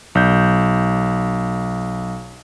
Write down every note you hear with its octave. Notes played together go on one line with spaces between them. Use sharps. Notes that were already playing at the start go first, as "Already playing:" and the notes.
B1 G6